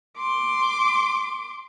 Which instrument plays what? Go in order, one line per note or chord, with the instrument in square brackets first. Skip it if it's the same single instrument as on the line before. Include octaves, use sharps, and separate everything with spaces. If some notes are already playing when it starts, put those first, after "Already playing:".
[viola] C6 D6